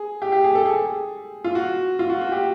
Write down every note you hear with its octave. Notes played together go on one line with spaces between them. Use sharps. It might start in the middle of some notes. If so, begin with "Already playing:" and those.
Already playing: G#4
G4
G4
G#4
A4
G#4
F4
F#4
F4
F#4
F#4
G4